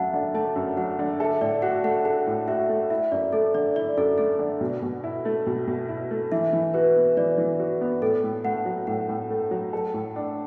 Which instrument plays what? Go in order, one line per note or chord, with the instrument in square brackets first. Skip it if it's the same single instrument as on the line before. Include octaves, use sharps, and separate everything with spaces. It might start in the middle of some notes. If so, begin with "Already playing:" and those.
Already playing: [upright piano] F#2 F#3 A3 [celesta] E5 F#5 A5
[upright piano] D3
[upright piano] A3 [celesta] A5
[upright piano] F#2
[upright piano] F#3 [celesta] F#5
[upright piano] D3
[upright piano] A4 [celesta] E5
[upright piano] A2 [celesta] D5
[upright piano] F#4 [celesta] F#5
[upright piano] A3 [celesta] F#5
[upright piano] A4 [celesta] F#5
[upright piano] A2
[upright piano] F#4 [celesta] E5
[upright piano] A3
[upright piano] E4 [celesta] E5
[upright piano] F#2 [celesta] D5
[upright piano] A3 [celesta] A4
[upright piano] D3 [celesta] D5
[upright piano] E4 [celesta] D5
[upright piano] F#2 [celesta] A4
[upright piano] A3 [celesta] A4
[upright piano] D3
B2
B2
E4
A3
B2
B2
E4
A3
[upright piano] E3 [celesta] E5
[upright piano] E3
[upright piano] F#4 [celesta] B4
[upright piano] B3
[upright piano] E3 [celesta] D5
[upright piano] E3
F#4
B3
[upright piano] A2 [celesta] A4
[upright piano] A2
[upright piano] A3 [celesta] F#5
[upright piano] F#3
[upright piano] A2 [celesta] F#5
[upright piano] A2
A3
F#3
A4
A2
D4